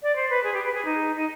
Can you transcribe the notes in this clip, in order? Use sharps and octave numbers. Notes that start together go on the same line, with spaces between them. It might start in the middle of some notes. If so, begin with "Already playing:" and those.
D5
C5
B4
G#4
G4
B4
G#4
D#4
D#4